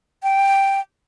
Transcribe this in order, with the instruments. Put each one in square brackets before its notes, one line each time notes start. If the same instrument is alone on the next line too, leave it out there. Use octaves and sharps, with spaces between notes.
[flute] G5